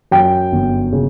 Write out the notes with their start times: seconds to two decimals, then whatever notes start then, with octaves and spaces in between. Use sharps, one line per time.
0.11 F#2 G5
0.52 G1
0.92 C#3